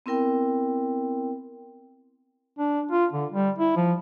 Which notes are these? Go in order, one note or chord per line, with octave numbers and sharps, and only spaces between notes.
B3 C4 E4 A#4 G5
D4
F4
D3
G3
E4
F3